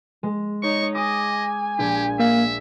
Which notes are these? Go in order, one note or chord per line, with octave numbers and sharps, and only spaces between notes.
G#3
D#4 C#5 D#5 C#6
D#5 G#5 D6 D#6 A#6
A#1 G4
A#3 E5 F5